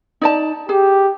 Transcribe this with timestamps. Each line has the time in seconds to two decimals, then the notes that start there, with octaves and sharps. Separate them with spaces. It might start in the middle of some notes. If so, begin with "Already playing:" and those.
0.21 D#4 D5 A5
0.69 G4 G#4